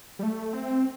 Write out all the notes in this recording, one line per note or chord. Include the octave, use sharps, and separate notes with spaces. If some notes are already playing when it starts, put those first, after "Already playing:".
G3
A3
C4